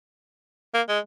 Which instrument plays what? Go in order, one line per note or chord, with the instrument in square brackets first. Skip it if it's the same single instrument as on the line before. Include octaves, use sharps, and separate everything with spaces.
[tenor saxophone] A#3
G#3